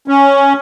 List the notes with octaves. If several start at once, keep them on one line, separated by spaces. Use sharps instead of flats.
C#4